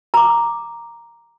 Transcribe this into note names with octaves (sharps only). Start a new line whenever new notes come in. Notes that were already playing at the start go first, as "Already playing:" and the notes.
A#5 D6